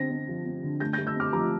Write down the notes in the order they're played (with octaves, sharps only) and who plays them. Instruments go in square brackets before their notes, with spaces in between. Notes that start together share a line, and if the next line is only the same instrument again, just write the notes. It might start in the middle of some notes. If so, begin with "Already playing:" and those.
Already playing: [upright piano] D3 C4 A#6
C4
F3
C4
D3
A3 G6 A#6
A3 G6 A#6
E6 G6
C4 D6 F6
F3 A#5 D6